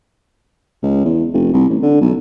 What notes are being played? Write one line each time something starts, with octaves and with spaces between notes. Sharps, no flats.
C#2
E2
F1
C2
A1
D3
B1